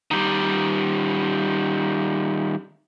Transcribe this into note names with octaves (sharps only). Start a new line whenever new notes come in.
D#3 G3